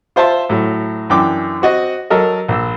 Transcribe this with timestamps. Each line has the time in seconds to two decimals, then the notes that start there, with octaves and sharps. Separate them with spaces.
0.16 F4 C5 E5 A5 C6
0.50 A2 F#3
1.10 F#2 E3 D4 G5 D6
1.62 C4 F#4 D#5
2.10 F#3 A4 A#4 D#5
2.48 A#1 E6